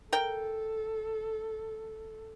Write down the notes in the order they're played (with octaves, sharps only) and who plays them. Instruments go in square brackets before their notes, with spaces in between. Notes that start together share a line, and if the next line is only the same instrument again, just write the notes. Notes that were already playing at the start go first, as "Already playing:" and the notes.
[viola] A4 [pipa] A#4 G5